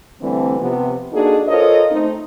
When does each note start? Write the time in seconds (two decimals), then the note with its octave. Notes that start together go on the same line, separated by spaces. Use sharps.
0.21 D3 E3 G3 A3 C4
0.59 C3 F3 B3
1.12 A#3 D4 D#4 F#4 G#4 A4
1.48 F4 A4 A#4 C5 C#5 D#5
1.90 A3 C4 D#4